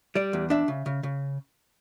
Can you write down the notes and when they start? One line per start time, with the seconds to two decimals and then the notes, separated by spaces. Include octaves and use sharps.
0.15 G3 D5
0.33 E2
0.50 D4 E5
0.68 C#3
0.86 C#3
1.03 C#3